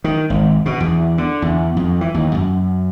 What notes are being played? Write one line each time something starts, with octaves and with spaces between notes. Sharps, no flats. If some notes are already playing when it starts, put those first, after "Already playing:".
D#3
G#1
B2
E2
D3
E2
F2
E3
D#2
F#2